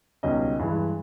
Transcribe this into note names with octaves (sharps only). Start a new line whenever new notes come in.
C#2 B2 G3 C#4 D#4 D#5
G2 E3 G#3